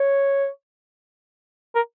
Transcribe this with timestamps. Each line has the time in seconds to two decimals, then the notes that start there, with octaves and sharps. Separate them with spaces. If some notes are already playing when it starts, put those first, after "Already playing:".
Already playing: C#5
1.75 A#4